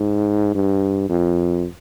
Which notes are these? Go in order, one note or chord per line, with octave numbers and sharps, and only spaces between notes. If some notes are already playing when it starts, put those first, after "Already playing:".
Already playing: G#2
G2
F2